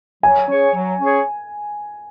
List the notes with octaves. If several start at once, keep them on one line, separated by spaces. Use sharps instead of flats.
F#3 G#5
C#4 G#4 C#5
F#3
C#4 G#4 C#5